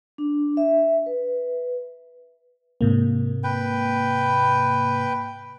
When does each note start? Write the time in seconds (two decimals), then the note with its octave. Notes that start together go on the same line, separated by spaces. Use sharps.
0.18 D4
0.57 E5
1.06 B4
2.81 G#2 C3 A#3
3.44 B4 G5